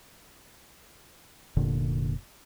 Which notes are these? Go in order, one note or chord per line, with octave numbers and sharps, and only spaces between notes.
F1 A#2 D3